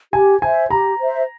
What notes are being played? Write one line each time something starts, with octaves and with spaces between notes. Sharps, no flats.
G4 G#5
C5 E5 G#5
G4 A#5
C5 E5